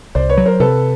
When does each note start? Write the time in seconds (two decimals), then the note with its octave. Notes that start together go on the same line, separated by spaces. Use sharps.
0.15 C2 C5 D5
0.29 B4 C#5
0.37 F#3
0.45 A#4 C5
0.60 C3 A4 B4